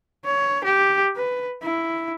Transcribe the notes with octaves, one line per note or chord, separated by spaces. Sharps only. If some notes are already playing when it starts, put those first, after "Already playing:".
C#5
G4
B4
E4